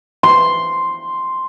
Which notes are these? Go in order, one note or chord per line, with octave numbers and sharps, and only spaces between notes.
C6